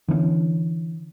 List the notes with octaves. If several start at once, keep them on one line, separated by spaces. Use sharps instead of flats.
D3 E3 B3 C#4